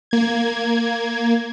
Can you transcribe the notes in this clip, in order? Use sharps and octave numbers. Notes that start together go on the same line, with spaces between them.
A#3 G#6